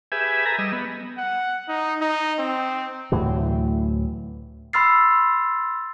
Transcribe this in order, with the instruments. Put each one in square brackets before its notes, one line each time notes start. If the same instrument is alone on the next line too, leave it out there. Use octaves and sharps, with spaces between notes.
[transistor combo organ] G4 G#4 B4 E5 G#5
A4 B4 G#5 A#5
G3 D#5 E6
B3
[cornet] F#5
D#4
D#4
C4
[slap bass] D2 A2 E3 F#3
[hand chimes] B5 C6 E6 F6 A6 C7